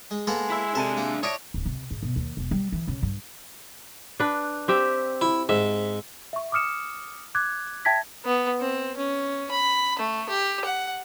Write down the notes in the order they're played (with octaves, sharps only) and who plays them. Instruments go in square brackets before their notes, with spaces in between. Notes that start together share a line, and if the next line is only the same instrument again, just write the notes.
[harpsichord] G#3
[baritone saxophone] G#3 [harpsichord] A#3 B3 A4
[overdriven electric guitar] E4 E5 [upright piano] B5 E6
[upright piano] C3 A5 D#7 [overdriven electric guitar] D4 E5 [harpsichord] A4
[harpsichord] A#3
[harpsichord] D4 E4 [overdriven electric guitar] C#5 [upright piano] D#6 A#6 D7
[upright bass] D1
C3
G#2
B2
D#2
E1
G3
E3
C#3
G2
[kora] D4 B4
C4 G4 E5
[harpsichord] E4
[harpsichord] G#2 [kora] E5
[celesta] E5 C#6
D6 D#6 F6 C#7 E7
D6 F#6 G#6
E5 G5 A5 G#6 A#6 B6
[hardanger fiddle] B3
C4
C#4
B5
A3
G4
F#5